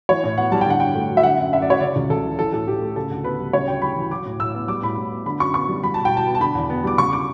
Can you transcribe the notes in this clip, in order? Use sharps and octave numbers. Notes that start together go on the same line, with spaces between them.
E3 C#5
A2
B3 F#5
G3 A5
G5
D3 F#5
G2 G5
A3
F#3
E5
D3 F#5
F#2
F#2 E5
D5
F#3 C#5
C#3 D5
C#2
C#2 A4
E3
E3 A4
A2 A4
A2 G4
A3
C#3 A4
D2
B3 B4
G3
C#3 C#5
D2 G5
G3 B5
E3
F#3 D6
A2
A2 E6
B3
G3 D6
A2 B5
A2
B3
D3 B5
F#2 C#6
B3 C#6
G3
G3 B5
B2 A5
G5
B2 A5
B3
A5
D3 B5
E2
B3
G3 D6
C#3 C#6
D6